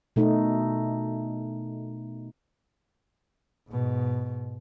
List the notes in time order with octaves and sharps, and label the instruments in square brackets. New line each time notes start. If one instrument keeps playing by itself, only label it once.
[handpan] B2 A3 D#4
[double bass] G#2 B2